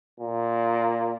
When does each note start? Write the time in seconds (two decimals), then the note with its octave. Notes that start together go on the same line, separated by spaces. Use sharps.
0.20 A#2